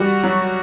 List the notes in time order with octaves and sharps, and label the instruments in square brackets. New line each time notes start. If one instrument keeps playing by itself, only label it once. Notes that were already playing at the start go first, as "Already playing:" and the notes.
Already playing: [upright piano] G3 [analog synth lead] F#4
[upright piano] F#3